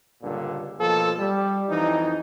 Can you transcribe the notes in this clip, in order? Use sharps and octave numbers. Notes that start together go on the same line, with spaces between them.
C#2 G2 A#2 D3
B2 F3 A#3 A4
G3
F2 E3 D#4